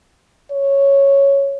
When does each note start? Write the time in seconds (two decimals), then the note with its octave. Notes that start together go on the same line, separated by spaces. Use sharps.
0.52 C#5